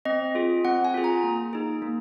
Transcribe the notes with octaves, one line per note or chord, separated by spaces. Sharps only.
C4 D#5
F4 G#4
C4 F#5
G#5
F4 G#4
A#5
A#3
D#4 G#4
A#3